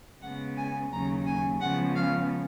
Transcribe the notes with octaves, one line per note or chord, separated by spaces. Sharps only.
C#3 G#3 B3 F#5
G#5
D#2 C#3 F#3 A#5
G#5
C#3 F3 G#3 B3 F#5
F5